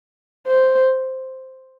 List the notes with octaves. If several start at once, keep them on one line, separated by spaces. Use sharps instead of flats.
C5